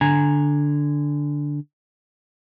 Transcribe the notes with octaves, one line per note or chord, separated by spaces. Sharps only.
D3 G#5 A#5